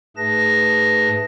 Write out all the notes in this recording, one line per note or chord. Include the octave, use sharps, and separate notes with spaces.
G#2 A3 G#4 B4 A5 A#6